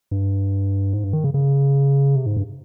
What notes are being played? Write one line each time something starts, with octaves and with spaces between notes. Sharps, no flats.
G2
G#2
G2
D#3
C#3
C#3
C3
G#2
G2